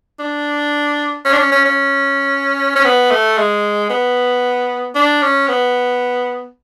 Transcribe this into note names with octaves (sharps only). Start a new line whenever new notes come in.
D4
C#4
D4
C#4
C#4
C#4
C#4
B3
A3
G#3
B3
D4
C#4
B3